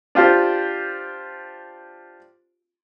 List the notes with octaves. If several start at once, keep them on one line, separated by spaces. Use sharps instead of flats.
D4 F4 G4 C5